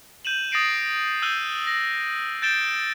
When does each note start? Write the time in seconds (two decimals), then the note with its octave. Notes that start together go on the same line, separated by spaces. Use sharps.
0.25 G6 D#7 E7 F#7
0.51 D#6 A6 A#6 C7 D7 F#7
1.22 E6 F#6 G6 D#7 G7
1.67 A#6
2.42 G6 A6 D7 E7 G7